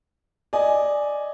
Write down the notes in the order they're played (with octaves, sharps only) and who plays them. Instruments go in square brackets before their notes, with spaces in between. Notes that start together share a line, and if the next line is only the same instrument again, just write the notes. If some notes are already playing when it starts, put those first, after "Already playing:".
[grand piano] D5 D#5 G#5